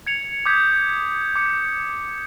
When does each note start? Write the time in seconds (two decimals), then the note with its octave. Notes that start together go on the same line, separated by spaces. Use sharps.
0.06 G#6 C#7 F7
0.46 D6 D#6 G6 G#6 B6
1.36 D6 C#7